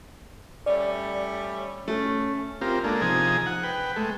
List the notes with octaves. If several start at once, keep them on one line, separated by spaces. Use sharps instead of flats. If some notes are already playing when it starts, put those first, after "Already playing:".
G3 A3 C#4 D5
A3 C#4
C4 F4 G4 A#4
G#3 A#3 D4 A4
C3 F3 D#4 G#4 G#5 A#5
F#5
B4 G5
G#3 A3